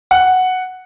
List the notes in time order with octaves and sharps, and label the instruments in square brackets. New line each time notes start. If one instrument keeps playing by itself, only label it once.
[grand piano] F#5